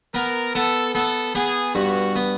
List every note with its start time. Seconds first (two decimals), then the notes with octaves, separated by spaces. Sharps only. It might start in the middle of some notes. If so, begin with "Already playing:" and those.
0.14 B3 A#4
0.55 B3 A4
0.95 B3 A4
1.35 B3 G#4
1.75 G2 F#4
2.16 B3